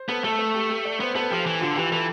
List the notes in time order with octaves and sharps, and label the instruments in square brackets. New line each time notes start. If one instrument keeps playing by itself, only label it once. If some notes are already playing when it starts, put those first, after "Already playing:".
Already playing: [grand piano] C5
[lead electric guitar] B3 [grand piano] A4
[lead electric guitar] A3 [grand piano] A4
[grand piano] A4
G4
G4
D5
[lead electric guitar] B3 [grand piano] C5
[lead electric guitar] B3 [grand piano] A4
[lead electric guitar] F3 [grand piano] G4
[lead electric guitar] E3
[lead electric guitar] D3 [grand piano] F4
[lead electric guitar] E3 [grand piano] G4
[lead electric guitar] E3 [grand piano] A4